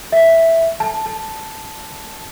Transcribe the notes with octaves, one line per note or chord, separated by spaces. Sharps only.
E5
A5
A5